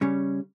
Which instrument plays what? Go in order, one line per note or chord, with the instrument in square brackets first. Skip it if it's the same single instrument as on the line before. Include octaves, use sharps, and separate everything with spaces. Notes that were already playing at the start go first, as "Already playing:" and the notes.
[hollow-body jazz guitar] C#3 G3 C#4